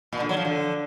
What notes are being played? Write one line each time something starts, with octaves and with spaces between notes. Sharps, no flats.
A#2
D3
F#3
F3
D3